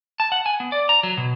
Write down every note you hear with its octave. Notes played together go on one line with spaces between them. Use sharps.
A5
F#5
G#5
B3
D5
A#5
F#3
B2